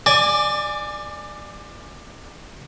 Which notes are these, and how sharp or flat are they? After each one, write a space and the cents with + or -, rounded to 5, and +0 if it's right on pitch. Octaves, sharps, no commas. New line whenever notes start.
D5 +25 G#5 +0 D6 +0